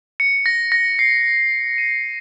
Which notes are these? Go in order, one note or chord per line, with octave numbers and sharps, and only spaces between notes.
C#7
A#6
A#6
C7
D#7